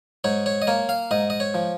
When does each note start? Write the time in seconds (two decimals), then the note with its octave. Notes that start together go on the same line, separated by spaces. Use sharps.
0.24 G#2 C#5
0.46 C#5
0.62 D#5
0.67 A#3 C#5
0.89 F5
1.11 G#2 D#5
1.30 D#5
1.40 C#5
1.54 F3